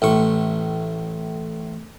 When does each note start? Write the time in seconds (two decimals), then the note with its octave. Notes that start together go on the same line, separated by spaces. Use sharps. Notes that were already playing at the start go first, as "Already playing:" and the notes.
0.02 A1 A2 C#6